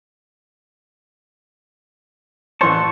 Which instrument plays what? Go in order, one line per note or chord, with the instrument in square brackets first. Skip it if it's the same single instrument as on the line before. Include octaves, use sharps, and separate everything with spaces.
[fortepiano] A1 E3 C5 [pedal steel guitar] A5 C#6